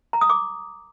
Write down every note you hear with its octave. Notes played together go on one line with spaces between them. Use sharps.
A#5
D#6
D6